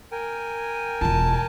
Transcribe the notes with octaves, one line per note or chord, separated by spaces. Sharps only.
A#4 G5 G#5
E1 F4 A5